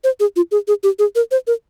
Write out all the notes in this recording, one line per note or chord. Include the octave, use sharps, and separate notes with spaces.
C5
G#4
F4
G#4
G#4
G4
G#4
A#4
C5
A#4